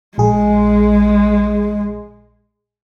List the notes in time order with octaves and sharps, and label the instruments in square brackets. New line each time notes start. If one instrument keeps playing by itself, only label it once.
[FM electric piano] A#1 G#4 [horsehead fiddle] G#3